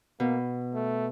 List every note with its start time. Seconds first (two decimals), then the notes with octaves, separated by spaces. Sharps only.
0.20 B2 A#3
0.75 A3